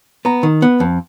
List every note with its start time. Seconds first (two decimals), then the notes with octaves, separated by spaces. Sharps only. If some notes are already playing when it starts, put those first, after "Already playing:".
0.25 B3 A#5
0.43 D#3
0.62 B3
0.80 F2